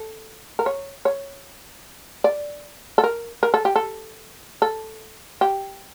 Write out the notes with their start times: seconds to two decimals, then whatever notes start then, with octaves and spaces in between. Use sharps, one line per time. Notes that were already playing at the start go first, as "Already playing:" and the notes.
Already playing: A4
0.59 A#4
0.66 C#5
1.05 C#5
2.24 D5
2.98 A4
3.04 A#4
3.43 A#4
3.54 A4
3.65 G4
3.76 A4
4.62 A4
5.41 G4